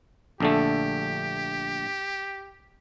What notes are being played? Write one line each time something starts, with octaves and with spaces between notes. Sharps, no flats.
A#1 D3 A3 G4